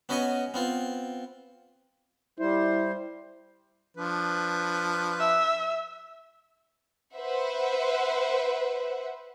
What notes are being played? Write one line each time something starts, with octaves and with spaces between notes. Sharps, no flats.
B3 C#4 F#4 B4 D#5 G#5
B3 C4 F4
G3 E4 C5
F3 D4 B4
E5
B4 C5 E5 F#5